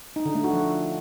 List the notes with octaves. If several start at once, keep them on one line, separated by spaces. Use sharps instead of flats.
D#4
D3
A3
F#4
F3